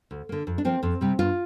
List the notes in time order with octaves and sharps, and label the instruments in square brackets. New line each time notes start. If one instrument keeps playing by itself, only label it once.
[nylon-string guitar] D2
D3 A#3
F2
D4
F3 A#3 C4
F2 C4
C3 G3
G2 F4